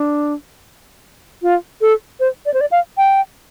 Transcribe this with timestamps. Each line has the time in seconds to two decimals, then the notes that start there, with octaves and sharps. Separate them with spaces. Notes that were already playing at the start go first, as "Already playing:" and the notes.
Already playing: D4
1.42 F4
1.81 A4
2.20 C5
2.46 D5
2.54 C5
2.61 D5
2.72 F5
2.98 G5